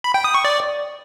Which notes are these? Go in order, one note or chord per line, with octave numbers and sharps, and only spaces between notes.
B5
G5
D#6
C#6
D5